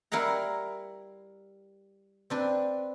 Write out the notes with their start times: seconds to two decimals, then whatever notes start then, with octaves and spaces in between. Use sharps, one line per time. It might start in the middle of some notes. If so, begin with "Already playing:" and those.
0.12 G3 E4 A#4 F5 F#5 A#5
2.30 C4 D4 B4